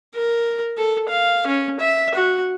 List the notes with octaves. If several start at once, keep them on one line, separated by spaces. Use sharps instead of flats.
A#4
A4
F5
C#4
E5
F#4